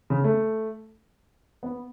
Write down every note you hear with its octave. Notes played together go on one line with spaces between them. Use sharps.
C#3
A3
B3